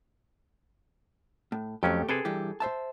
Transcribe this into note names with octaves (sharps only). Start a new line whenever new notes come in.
A2
F2 F#3 A3 C#4 G4
C3 G#4 A4 B4 G5
G2 E3 G4
C5 E5 A5